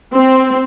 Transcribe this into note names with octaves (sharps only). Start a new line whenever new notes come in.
C4